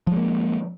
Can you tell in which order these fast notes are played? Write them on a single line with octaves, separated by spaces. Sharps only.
F3 G#3 A#3